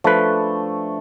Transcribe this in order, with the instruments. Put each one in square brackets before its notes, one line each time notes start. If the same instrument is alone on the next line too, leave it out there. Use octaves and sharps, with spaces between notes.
[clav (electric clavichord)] F3 B4 [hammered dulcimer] A3 D4